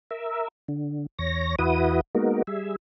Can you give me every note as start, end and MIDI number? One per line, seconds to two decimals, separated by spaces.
0.11 0.48 70
0.11 0.48 76
0.68 1.06 50
1.19 1.55 40
1.19 1.55 73
1.19 1.55 94
1.59 2.01 40
1.59 2.01 64
1.59 2.01 66
1.59 2.01 71
1.59 2.01 87
2.15 2.42 56
2.15 2.42 58
2.15 2.42 59
2.15 2.42 63
2.15 2.42 66
2.15 2.42 70
2.47 2.76 55
2.47 2.76 68
2.47 2.76 76